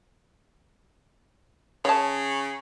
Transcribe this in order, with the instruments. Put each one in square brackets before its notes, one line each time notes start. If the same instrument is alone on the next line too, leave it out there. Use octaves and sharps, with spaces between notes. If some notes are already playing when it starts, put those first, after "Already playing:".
[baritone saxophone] C#3 [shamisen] C#5 A5